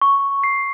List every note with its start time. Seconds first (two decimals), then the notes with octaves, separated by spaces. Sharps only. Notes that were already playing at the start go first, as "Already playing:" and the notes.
0.01 C#6
0.44 C7